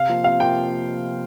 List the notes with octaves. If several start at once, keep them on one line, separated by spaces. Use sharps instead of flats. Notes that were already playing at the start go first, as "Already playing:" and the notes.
Already playing: C3 F5
F3 A#3 F4
C3 F5
F3 A#3 F4 G5